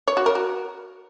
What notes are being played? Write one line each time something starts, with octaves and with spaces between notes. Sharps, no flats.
C#5
F#4
A#4
F#4